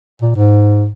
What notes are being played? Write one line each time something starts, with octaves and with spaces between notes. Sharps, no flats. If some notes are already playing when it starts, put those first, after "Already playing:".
A#2
G#2